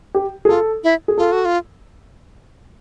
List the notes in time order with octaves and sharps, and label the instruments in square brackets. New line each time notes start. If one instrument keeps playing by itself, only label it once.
[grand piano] G4
G#4
[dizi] F4 [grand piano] A4
[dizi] E4
[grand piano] G#4
[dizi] F4 [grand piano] A4
[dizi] F#4
F4